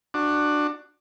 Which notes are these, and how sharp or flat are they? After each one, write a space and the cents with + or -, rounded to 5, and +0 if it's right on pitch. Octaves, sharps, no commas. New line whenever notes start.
D4 +15 F#4 +0